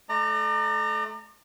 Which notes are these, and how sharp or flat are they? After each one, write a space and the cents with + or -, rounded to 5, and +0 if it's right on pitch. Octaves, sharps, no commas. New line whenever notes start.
A3 -25 D5 +35 A#5 -20